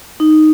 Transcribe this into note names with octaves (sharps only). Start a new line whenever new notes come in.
D#4